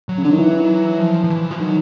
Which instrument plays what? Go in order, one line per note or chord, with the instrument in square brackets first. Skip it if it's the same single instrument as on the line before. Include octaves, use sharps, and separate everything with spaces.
[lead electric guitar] F#3
[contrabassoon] C#3
[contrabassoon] D3 [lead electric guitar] F#3
[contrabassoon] D#3
E3
[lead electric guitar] F3
F3
E3
F3
[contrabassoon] D#3 [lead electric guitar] F#3